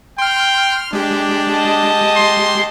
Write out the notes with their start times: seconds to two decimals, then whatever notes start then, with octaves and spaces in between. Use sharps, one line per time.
0.18 G5 C6 F6
0.93 G#3 D4 G4
1.50 D#5 A5
2.16 C6